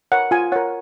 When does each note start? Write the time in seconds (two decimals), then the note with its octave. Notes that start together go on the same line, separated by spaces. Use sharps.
0.12 A#4 C#5 F#5
0.31 F4 G#5
0.52 A#4 C#5 F#5